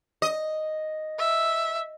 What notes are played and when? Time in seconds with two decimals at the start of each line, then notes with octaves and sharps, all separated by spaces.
0.22 D#5
1.19 E5